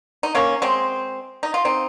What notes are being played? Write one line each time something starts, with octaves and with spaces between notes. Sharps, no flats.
D#4
A#3 C#4
G#3 C4
D#4
F4
C4 D#4